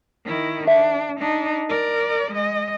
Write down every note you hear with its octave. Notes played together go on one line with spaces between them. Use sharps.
D#3 E4
D4 E5
D4 D#4
A#4 D5
G#3 D#5